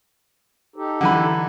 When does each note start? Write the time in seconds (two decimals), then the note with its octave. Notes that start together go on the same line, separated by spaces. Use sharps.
0.76 D#4 G4 A4
1.01 D3 E3 B5